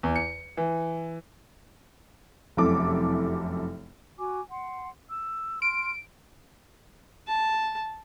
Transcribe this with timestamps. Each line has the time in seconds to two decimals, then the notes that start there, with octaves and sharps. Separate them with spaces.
0.03 E2
0.16 C#7
0.57 E3
2.57 F1 F#2 C3 E4 A4 D6
4.18 F#4 G#5 D6
4.50 F#5 C6
5.10 E6
5.62 C6 F6 D7
7.27 A5